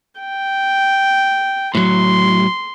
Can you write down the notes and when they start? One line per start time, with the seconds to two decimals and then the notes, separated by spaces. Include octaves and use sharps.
0.20 G5
1.75 A2 F#3 C6